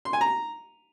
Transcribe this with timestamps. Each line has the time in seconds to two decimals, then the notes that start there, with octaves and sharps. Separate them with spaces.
0.05 C6
0.13 G#5
0.21 A#5